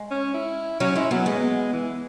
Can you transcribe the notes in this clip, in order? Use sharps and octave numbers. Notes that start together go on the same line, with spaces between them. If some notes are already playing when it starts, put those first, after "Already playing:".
Already playing: G#3
C#4
E4
F#3 C#4
G#3 E4
F#3 B3
G#3 B3
E3